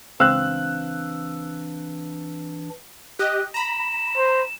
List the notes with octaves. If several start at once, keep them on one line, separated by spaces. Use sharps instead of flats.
C#2 E3 C4 D4 F5 E6 F#6
G4 D#5 F#6
A#5 B5 E7
C5